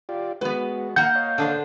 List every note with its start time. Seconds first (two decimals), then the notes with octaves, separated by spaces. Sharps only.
0.09 F4 G4 D5
0.41 G#3 B3 F#4 B4
0.96 A#3 F#5 G6
1.15 C#5 D#5 F5
1.38 D3 D4 C5